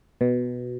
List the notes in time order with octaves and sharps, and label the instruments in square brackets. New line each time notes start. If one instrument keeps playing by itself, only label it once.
[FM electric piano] B2